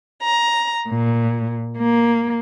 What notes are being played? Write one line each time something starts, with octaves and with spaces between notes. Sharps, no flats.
A#5
A#2
A#3